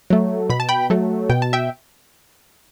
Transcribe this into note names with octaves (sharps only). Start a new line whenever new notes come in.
F#3 A3
B2 B5
A5
G5 B5
F#3 A3
B2 G5
A5
E5 G5